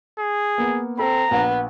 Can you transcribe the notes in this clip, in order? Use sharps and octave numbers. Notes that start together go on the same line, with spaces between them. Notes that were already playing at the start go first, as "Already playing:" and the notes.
G#4
A#3 B3
C4 A4 A#5
A#1 B3